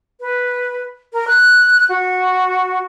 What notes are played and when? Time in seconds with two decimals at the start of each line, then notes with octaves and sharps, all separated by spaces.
0.20 B4
1.13 A#4
1.28 F#6
1.89 F#4